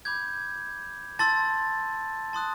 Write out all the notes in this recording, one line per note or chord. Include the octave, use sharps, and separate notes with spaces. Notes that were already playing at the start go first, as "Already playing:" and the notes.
B5 D6 G6 G#6
A5 C6 E6 A6
A5 C6 D#6 F#6